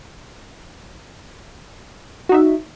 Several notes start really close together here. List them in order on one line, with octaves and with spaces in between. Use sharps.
F#4 D#4 E5